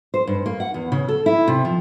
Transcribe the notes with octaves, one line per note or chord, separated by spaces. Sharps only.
C5
G2
A#3
F#5
E2
C#3
A4
E4
C3
F3